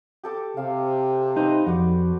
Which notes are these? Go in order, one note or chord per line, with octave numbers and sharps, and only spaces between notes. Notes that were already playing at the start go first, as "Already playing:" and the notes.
G4 A4 D6
C3 F5
D#4 B4 C5
F2 F#4 D5